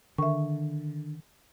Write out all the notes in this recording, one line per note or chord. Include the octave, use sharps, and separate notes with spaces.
D3 D#3 E5 C#6